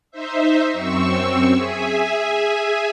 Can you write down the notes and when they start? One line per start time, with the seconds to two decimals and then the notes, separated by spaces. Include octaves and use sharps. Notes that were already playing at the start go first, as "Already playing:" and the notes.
0.11 D#4 C5 E5
0.72 F#2 C4 C#6 E6
1.53 G#4 E5 G#5